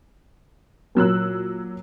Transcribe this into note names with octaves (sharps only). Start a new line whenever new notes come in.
A#2 F#3 E6 F#6